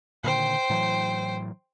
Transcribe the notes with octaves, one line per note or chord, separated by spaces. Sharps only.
A#2 D3 D#3 C5 G5
A2 E3 F#3